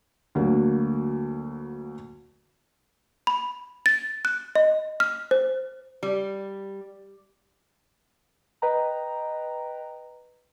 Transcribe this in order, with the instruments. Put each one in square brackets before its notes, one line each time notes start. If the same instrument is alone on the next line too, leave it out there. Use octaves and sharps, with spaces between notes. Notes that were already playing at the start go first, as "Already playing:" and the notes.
[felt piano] D2 D3 F#3 A#3
[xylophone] B5
A6
F#6
D#5
F6
C5
[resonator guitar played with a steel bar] G3
[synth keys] B4 D#5 G5 A#5